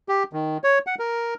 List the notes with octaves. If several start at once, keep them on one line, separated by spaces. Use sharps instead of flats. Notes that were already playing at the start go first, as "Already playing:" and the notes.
G4
D#3
C#5
F#5
A#4